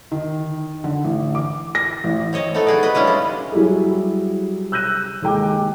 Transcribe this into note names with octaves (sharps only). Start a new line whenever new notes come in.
D#3
D3
A1
D6
A#6
A1
C4 C#5 D#5 A5
A3 B3 C4 D#4 A4
F#4 G#4 D5
B4 D#5
G#3 C#4 D4 E4 F4
G3 E4
F#3 G3 E4 G4 G#4
E6 F#6 G6 A#6 D#7
D#2 G#3 G5 D6